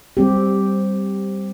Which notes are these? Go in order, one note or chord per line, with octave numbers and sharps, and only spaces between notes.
G3 C4 G4